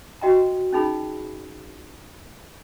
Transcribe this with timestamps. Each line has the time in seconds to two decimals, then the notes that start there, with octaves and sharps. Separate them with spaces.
0.21 F#4 D#5 G5 A#5
0.73 C#4 D#4 G#4 B5